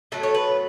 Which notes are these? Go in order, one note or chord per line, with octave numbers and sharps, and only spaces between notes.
A2 F#3 B3 A4
C#5
B4